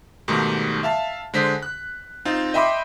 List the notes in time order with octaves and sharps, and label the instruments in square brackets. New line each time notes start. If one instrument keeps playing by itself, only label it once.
[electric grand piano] G#2 B2 D#3 G3 A3
E5 F5 A5
D3 G#3 C5 B6
F#6
C4 D#4 F4
D#5 E5 G5 B5 C6 D6